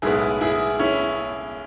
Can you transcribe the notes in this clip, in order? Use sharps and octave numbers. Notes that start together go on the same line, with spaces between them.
B1 A2 G#3 B3 E4 G#4
E4 G#4
C#4 E4